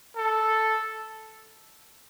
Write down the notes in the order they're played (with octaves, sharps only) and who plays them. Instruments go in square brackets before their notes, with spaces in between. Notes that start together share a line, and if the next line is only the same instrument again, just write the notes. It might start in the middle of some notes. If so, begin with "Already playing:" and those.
[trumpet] A4